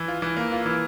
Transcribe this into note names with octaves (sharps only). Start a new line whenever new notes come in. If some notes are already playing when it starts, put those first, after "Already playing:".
Already playing: E3
F4
E3
A#3
F4
E3